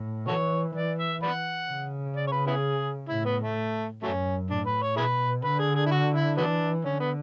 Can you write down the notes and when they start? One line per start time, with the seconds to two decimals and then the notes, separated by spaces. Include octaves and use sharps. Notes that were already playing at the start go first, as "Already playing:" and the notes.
Already playing: A2
0.28 E3 F#4 A4 C#5
0.75 E3 D5
0.98 E5
1.23 B4 D5 F#5
1.69 C#3
2.16 D5
2.27 C#5
2.32 B4
2.47 B3 E4 G#4
3.09 A2 E4
3.25 B3
3.41 A3
4.03 F#2 F#3 A3 C#4
4.50 A2 D4
4.66 B4
4.82 C#5
4.97 B2 E4 G#4 B4
5.44 D3 B4
5.59 G#4
5.75 G#4
5.86 E4
5.91 F#4
6.14 E4
6.37 E3 F#3 B3 D4
6.84 D3 C#4
7.00 B3